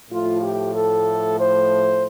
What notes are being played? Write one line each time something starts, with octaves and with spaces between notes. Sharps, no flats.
A2 F3 A3 F4
G4
A4
C5